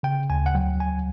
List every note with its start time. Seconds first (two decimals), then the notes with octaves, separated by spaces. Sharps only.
0.03 C#3 G5
0.30 D2 G#5
0.46 F#5
0.55 F#3 G5
0.80 D2 G#5